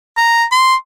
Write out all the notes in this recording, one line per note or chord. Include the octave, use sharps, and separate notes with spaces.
A#5
C6